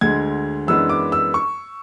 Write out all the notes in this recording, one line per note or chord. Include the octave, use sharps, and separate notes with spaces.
D2 D3 G#3 G#6
F#2 E3 G#3 B3 D4 E6
D6
E6
C#6